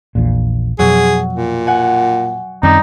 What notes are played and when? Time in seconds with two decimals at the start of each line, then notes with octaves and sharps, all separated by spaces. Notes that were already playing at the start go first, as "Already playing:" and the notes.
0.15 A#1 E2 A#2
0.79 F2 B2 F#3 G#4
1.33 A#2
1.67 F#5 G#5
2.63 F#2 D#3 G3 C4 D#4